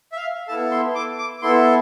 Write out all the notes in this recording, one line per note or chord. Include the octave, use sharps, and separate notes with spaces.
E5
F5
B3 E4 A4 A5
C6
D6
D6
B3 E4 A4 C6